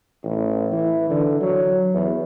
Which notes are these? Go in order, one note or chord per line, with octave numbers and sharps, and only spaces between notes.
A1
E3
D3
F#3
E2